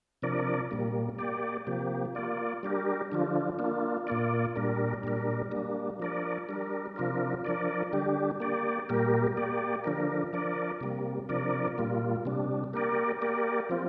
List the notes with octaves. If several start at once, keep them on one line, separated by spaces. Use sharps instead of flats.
C3 F3 D4 A#4 D5
A#2 G3 A#3
A#3 G4 D5
C3 F3 A#3 G4
A#3 F4 D5
G3 D4 G4 A#4
D3 F3 D4 F4
A#3 D4 F4
A#2 A#3 F4 D5
A#2 G3 D4 A#4
A#2 G3 D4 A#4
G3 A#3 D4
F3 D4 A#4 D5
G3 D4 A#4
C3 F3 D4 F4 A#4
F3 D4 A#4 D5
D3 G3 D4 G4
A#3 G4 D5
A#2 G3 A#3 G4 A#4
A#3 G4 D5
D3 F3 D4 A#4
F3 D4 A#4 D5
C3 G3 A#3
C3 F3 D4 A#4 D5
A#2 G3 A#3 F4
C3 G3 D4
A#3 G4 A#4 D5
A#3 G4 A#4 D5
F3 C4 F4